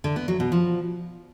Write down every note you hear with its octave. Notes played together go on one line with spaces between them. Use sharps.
D3
B3
F#3
B2
F3